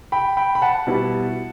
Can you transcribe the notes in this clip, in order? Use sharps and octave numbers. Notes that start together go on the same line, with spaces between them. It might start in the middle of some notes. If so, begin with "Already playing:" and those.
G5 B5
G5 B5
B5
F#5 A5
B2 G3 B3 E4